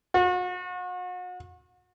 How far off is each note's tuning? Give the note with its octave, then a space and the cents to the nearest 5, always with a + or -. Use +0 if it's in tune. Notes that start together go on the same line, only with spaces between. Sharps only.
F#4 -40